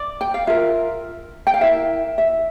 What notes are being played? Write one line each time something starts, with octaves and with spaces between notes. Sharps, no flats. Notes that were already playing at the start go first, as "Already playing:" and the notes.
Already playing: D5
G5
F5
F4 A#4 E5
G5
F5
E4 A#4 E5
E5